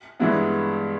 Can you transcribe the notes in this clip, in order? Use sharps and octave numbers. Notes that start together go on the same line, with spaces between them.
G2 E3 G#3 B3 E4